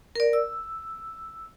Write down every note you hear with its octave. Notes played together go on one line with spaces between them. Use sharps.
A#4 D5
E6